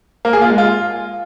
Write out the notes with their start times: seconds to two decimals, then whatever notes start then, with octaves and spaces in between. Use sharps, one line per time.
0.25 A#3
0.33 G#4
0.41 F4
0.50 G#3
0.58 F4